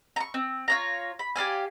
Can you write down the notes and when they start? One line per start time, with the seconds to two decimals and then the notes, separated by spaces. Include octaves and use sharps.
0.16 A#5 C#6
0.34 C4
0.68 F4 C#5 A#5
1.19 B5
1.36 G4 D5 F5 G#5